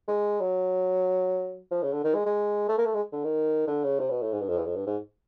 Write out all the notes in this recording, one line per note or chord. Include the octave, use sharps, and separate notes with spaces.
G#3
F#3
F3
C#3
D3
D#3
G#3
G#3
A3
A#3
A3
G#3
D3
D#3
D3
C#3
C3
B2
A2
G#2
G2
F2
E2
F2
G2
G#2